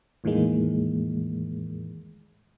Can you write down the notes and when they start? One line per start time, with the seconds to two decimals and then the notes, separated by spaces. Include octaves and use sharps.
0.24 E2 A2 D#3 E3 G#3 A#3